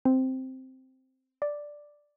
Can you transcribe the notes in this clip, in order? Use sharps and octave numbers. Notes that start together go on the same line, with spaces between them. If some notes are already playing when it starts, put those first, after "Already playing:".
C4
D5